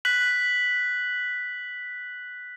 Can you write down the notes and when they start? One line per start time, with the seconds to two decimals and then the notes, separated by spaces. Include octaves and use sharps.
0.05 F#6 B6 F#7